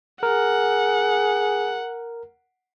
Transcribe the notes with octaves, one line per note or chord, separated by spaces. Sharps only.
G#4 A#4 F#5